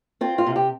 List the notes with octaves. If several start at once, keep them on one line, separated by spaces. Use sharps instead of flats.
C4 F4
F4
C3
G4